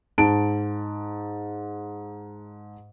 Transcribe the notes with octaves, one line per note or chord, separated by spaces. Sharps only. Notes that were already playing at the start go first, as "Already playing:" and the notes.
G#2 A5 D7